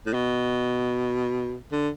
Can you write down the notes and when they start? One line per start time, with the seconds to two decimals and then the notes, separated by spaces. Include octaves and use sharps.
0.06 A2
0.14 B2
1.72 D3